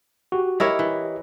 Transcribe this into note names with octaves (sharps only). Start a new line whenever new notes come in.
F#4 G4
E4 G4 A#4 C#5 D#5
E3